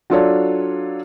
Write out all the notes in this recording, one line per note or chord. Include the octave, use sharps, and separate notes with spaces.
F#3 D4 F4 A4 C#5 D5